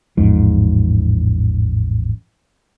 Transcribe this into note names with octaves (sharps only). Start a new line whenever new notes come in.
A1 E2 G#2 F3